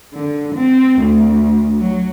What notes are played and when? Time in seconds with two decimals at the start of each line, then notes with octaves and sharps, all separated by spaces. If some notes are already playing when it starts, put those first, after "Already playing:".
0.14 D3
0.55 C4
1.00 D2
1.80 F#3